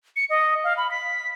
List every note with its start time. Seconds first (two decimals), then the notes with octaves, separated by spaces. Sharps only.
0.16 C#7
0.30 D#5
0.64 F5
0.77 B5
0.91 B6